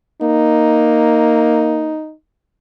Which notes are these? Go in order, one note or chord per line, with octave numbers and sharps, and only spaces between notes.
A#3 D#4